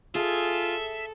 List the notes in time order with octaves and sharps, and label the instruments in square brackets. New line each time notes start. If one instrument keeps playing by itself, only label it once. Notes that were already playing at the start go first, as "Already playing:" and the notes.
[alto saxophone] F4 [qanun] G#4 [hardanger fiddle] A4 [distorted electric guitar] E5